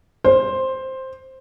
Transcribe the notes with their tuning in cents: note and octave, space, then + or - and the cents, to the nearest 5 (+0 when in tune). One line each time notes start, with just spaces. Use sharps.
C5 +5